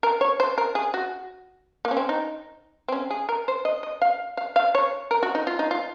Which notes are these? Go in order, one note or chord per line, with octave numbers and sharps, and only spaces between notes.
A#4
C#5
C5
A#4
G#4
F#4
A#3
C#4
C4
D#4
C4
C#4
G#4
A#4
C5
D#5
D#5
F5
F5
F5
C#5
A#4
F#4
D#4
F4
D#4
F4